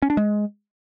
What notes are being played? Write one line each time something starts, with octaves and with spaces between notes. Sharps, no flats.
C#4
D4
G#3